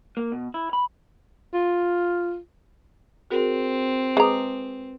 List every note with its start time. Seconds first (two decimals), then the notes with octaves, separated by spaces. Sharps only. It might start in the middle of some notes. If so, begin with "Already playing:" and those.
0.17 A#3
0.32 B2
0.54 E4
0.73 B5
1.54 F4
3.30 C4 F#4 G#4 A#4
4.17 G#3 B4 A#5 D6 D#6